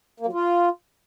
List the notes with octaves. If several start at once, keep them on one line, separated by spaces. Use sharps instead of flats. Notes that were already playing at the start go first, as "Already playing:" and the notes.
A#3
F#3
F4